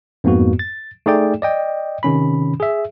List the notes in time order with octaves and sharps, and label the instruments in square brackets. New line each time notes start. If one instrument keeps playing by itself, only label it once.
[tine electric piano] F2 G#2 A#3 B3 F#4
A6
A3 D#4 G#4 D5 G5
D5 D#5 G5
C3 D#3 C#4 B5
G#4 E5